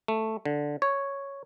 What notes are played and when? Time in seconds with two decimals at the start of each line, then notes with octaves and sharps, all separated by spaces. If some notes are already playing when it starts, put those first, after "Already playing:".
0.08 A3
0.45 D3
0.82 C#5